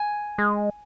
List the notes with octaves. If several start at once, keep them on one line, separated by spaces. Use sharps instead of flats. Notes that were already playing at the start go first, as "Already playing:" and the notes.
Already playing: G#5
G#3